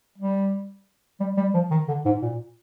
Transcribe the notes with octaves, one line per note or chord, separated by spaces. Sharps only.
G3
G3
G3
F3
D#3
D3
G#2
A#2